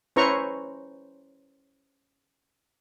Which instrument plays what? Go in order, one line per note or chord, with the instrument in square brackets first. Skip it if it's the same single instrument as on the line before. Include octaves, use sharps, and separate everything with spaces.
[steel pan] C#4 E4 B4 C5 A#5 C#6